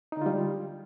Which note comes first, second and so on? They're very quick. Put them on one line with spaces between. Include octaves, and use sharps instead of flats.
D#4 D3 F4 G3